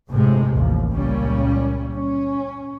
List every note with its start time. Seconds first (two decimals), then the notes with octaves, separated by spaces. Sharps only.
0.11 G1 A2 C3 G#3
0.56 A1 D#2 F3
0.90 C#2 A#2 G3 C#4
1.95 C#4